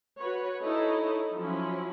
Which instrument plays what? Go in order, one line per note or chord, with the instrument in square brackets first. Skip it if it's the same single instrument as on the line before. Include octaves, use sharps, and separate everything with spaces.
[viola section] F#4 B4 C#5
D#4 E4 A4 C#5 D#5
F3 F#3 C#4 E4